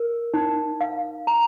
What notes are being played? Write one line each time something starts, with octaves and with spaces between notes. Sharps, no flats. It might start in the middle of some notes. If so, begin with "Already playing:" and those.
Already playing: A#4
D#4
F5
A#5